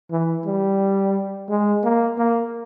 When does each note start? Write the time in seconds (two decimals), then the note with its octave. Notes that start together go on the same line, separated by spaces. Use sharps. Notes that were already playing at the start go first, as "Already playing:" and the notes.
0.11 E3
0.46 G3
1.49 G#3
1.84 A#3
2.18 A#3